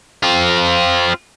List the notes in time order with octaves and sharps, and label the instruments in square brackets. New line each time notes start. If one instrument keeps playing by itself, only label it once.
[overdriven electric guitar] C4 F4